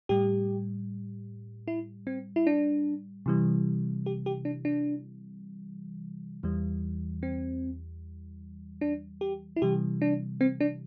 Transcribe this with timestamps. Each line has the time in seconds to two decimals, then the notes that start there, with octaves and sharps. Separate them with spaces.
0.09 A2 G3 G4
1.68 E4
2.07 C4
2.36 E4
2.47 D4
3.26 C3 E3 G3
4.06 G4
4.26 G4
4.45 D4
4.65 D4
6.43 E2 E3 G3
7.23 C4
8.81 D4
9.21 G4
9.56 E4
9.62 C3 E3 G3 G4
10.02 D4
10.41 C4
10.60 D4